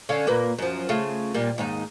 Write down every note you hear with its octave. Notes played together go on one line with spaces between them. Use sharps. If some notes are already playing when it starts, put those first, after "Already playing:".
D3 C#4 F5
A#2 A#3 B4
F#2 F3
C#3 A3 F4
A#2 G3 A#3
D#2 G#2 D#4